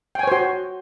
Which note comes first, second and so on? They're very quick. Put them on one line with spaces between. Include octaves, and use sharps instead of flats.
G5 G#5 C#5 C5 F#4